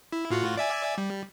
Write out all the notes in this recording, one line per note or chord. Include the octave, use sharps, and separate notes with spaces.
E4
A2 F4 F#4
D5 E5 G#5
G3